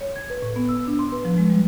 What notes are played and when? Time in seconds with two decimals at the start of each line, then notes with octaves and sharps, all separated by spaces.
0.01 C#5
0.16 G#6
0.30 B4
0.42 A2
0.56 B3
0.69 E6
0.87 D4
0.99 C6
1.12 B4
1.25 F3
1.38 G#3
1.50 G3